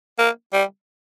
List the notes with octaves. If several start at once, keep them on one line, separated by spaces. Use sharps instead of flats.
A#3
G3